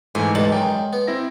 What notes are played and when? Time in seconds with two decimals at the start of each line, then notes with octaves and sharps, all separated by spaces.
0.15 G#2 E3 A3 G#5
0.35 G2 G#3 A5
0.52 F#2 D#3 G5
0.93 B3
1.08 C4 E4 A#6